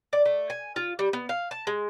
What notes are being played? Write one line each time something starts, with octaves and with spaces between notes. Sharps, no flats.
D5
A3
G#5
F4
G3
B3
F5
A5
G#3